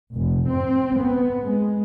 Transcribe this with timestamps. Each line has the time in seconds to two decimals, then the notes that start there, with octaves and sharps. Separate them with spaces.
0.13 F1
0.47 C4
0.98 B3
1.43 G#3